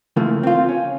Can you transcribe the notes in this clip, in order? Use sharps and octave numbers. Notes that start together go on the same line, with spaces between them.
C#3 E3 F3 A3 A#3
C4 F4
C#4